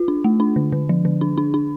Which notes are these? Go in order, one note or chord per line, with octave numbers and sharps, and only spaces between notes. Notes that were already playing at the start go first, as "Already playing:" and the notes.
Already playing: F4
D4
A3
D4
D3
D3
F3
D3
D4
D4
D4